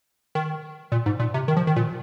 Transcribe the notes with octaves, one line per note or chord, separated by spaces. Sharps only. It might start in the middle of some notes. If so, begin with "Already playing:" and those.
D#3
A#2
G#2
A#2
C3
D#3
F3
D#3
A#2